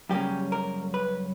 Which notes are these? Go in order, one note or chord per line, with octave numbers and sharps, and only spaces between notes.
F#2 C#3 G3 A#3 C#4 G4
A#4
B4